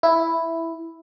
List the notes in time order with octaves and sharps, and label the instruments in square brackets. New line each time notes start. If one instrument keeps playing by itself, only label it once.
[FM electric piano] E4